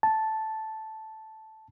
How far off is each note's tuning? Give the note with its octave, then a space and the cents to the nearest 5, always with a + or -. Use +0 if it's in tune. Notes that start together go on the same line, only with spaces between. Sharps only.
A5 -5